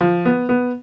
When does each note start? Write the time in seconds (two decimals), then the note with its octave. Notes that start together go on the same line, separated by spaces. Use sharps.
0.01 F3
0.25 B3
0.49 B3